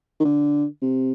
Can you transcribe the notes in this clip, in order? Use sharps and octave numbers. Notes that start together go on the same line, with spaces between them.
D#3
D3
C3